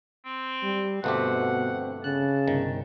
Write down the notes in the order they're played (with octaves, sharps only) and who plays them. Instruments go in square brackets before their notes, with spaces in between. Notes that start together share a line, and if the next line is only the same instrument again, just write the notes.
[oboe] C4
[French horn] G3
[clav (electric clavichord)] G1 A3 G4 [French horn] B2 [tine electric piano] B3 C4 [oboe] F#5
[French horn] C#3 [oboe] A5 [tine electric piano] F#6
[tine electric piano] G1 C2 [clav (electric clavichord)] D#3